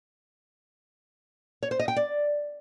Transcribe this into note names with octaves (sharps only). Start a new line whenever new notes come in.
C#5
C5
D#5
G5
D5